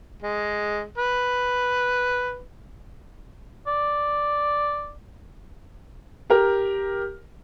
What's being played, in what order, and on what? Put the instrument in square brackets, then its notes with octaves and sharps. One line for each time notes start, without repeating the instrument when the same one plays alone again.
[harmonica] G#3
B4
[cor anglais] D5
[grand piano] G4 A#4